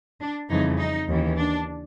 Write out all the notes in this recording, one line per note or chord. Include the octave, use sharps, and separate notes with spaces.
D4
F2 C#3 E3 G3 D#4
D#4
D#2 C#3 E3
D4